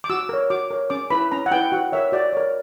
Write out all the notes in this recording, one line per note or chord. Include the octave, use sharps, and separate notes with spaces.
D6
F#4 E6
A#4 C#5
F#4 D6
A#4 C#5
C#4 D6
E4 B4 B5
C#4 A#5
F#5
E4 B4 G5
F#4 F#5
A#4 C#5 E5
F#4 D5
A#4 C#5